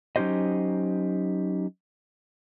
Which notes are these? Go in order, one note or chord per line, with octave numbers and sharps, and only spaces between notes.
F#3 C#4 D#4 G4 C5 D#5